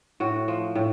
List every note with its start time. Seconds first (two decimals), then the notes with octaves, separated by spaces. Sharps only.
0.20 A2 F#4
0.48 F3
0.75 A2